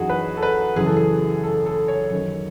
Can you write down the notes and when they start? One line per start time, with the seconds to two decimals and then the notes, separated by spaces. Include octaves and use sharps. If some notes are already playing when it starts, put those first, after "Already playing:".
Already playing: F#2 E3 D#4 F#4 G#4
0.09 B4
0.37 A4
0.43 B4
0.76 F#2 C#3 E3 G#4
0.86 A4
0.96 G#4
1.44 A4
1.66 A4
1.88 C#5
2.11 F#2 D#3